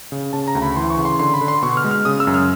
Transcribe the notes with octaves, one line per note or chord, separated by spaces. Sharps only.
C#3
C#3 A5
A#5
D2
B5
E3 C6
C#6
C#3
C6
D3 C6
B5
D3
C6
B2 C#6
F6
G#3
F6
C#3 D#6
E6
F#2
F6